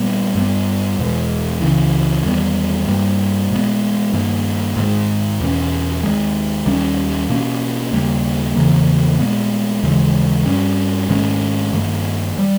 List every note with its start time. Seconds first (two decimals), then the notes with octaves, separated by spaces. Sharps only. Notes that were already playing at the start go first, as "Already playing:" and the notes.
Already playing: A#2 G3 B3
0.35 G2 G3 B3
0.98 E2 B2 G#3
1.61 C#2 C#3 E3
2.24 E2 D#3 G3 B3
2.87 G2 G3 A#3
3.51 A#2 G#3 B3
4.14 G2 D#3 A#3
4.77 G#2 D#3 G#3
5.41 E2 B2 A#3 C#4
6.03 D#2 D#3 G#3
6.66 D#2 D#3 G3 C#4
7.30 B2 A#3 C#4
7.93 D#2 C#3 G3 A#3
8.56 E2 C#3 E3 A#3
9.19 A#2 G#3 B3
9.83 D#2 C#3 E3 G#3
10.46 G2 G3 C#4
11.09 G#2 D#3 G#3 C#4
11.73 G2 D#3 A#3
12.38 E3 G3